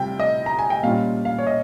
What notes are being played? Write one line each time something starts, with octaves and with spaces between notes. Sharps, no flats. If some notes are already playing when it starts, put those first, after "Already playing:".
Already playing: C3 G3 C4 F4 G5
D#5
A#5
G#5
G5
A#2 G3 C#4 F4 F5
F5
C#5
D#5